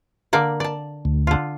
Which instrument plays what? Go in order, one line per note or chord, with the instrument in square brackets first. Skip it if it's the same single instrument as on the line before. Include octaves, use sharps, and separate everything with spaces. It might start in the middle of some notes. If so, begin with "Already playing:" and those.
[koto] D3 A#3 D5
D5 A5
[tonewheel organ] D2
[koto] D3 F4